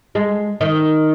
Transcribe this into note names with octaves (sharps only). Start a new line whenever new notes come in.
G#3
D#3